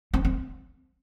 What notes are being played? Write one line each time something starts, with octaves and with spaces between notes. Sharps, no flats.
C4
C4